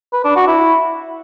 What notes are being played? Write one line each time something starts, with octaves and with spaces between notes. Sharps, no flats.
B4
D4
F#4
E4